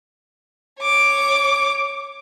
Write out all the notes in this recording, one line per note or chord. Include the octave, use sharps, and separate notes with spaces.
C#5 D6